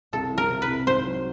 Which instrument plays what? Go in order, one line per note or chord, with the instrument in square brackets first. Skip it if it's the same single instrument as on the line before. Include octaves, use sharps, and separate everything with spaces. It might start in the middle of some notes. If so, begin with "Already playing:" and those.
[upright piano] C2 [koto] A4
[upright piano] E3
[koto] A#4
[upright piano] C3
[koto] B4
[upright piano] C2
[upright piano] G#2 [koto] C5
[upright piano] F#3